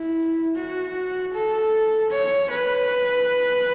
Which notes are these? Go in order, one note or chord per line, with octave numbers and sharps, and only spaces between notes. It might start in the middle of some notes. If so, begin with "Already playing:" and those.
Already playing: E4
F#4
A4
C#5
B4